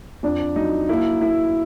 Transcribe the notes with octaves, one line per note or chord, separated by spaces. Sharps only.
F2 D4
F#3 D#4
A#3 E4
A#3 E4